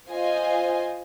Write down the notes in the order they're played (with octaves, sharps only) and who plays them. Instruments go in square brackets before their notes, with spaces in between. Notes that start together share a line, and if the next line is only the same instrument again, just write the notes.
[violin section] F4 C5 D#5 G#5